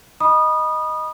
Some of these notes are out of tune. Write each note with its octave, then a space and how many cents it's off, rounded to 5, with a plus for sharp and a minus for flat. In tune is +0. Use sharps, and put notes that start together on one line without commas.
D#5 +0 B5 -25 D#6 -20